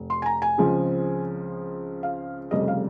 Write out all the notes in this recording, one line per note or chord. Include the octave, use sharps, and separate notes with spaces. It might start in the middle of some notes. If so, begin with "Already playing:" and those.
Already playing: F1
C6
G#5
A#5
G#5
C#2 C#3 F3 G#3 C4
F5
F1 F2 C#3 G3 D#5
F5